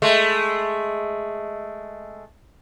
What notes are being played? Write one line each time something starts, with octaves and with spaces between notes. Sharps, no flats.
G#3 A3